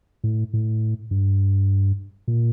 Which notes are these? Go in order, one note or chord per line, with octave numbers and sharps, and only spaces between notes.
A2
A2
G2
A#2